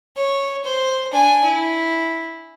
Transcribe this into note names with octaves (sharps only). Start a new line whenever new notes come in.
C#5
C5
D4 G#5
E4